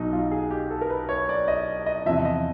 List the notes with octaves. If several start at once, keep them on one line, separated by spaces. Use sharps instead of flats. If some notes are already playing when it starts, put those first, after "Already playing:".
Already playing: B1 B2 F#3 D#4
F4
G#4
G4
A4
A#4
B4
C#5
D5
D#5
D#5
E2 C3 F3 E5
D#5